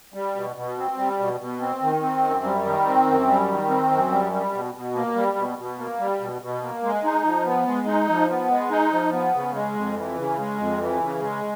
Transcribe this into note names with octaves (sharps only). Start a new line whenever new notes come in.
G3
B2
B2
C4
G3
B2
B2
C4
D#3
C4
F#2
G3
D#3
C4
F#2
G3
D#3
C4
F#2
G3
G3
B2
B2
A#3
G3
B2
B2
A#3
G3
B2
B2
A#3
G#3
D#4
F3
B3
G#3
D#4
F3
B3
G#3
D#4
F3
B3
C#3
G#3
F2
E3
C#3
G#3
F2
E3
C#3
G#3